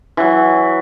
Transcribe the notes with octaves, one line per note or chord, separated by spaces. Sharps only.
E3 F#3